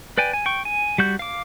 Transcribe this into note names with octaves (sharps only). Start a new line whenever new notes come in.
B4 D5 G5 G#5
G#5
G5 C#6
G#5
G3 F#4 G6
F5 D6